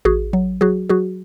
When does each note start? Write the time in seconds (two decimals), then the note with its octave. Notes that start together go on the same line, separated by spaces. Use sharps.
0.05 A1 F#4 G#4
0.33 F#3
0.61 F#3 F#4 G#4
0.89 F#3 F#4 G#4